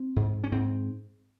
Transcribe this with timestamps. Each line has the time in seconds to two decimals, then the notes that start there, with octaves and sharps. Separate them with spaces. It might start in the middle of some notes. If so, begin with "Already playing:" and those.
Already playing: C4
0.16 G#2
0.44 C#4
0.52 G#2 C4